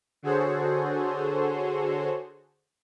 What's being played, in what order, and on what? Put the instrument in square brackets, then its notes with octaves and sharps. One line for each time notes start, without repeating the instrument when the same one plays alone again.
[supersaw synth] D3 F#4 G#4 A4 C5 C#5